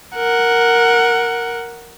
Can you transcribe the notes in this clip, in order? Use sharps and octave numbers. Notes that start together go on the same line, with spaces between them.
A#4 F#5